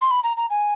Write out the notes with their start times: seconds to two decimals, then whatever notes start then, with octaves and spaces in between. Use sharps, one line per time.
0.02 C6
0.11 B5
0.24 A#5
0.37 A#5
0.50 G#5